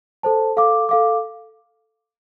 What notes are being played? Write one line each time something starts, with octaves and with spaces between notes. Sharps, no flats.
A4 C5 A5
A4 F5 D6
A4 F5 D6